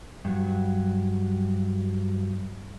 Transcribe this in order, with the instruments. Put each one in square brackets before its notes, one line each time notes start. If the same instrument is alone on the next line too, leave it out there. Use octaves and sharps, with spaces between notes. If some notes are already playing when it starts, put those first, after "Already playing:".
[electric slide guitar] G2 F#3